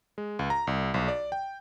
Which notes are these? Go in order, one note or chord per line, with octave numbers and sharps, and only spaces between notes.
G#3
C#2
A#5
C2
B1
D5
G5